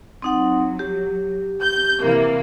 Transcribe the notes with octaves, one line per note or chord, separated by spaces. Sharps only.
F#3 C4 D#4 F#5
G4
G6
C3 E3 A#3